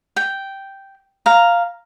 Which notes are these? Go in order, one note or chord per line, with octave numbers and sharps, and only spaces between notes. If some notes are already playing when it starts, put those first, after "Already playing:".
G5
F5 A#5